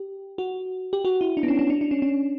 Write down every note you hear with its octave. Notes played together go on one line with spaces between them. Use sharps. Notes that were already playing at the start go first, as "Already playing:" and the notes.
Already playing: G4
F#4
G4
F#4
E4
D4
B3
C#4
C#4
D4
D4
C#4
C#4